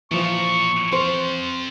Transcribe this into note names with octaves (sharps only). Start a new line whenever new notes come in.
A#2 E3 F3 C#6
C4 C5 F5